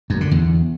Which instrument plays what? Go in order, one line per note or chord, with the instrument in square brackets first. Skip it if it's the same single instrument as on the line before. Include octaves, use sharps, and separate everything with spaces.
[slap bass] F#2
D3
E2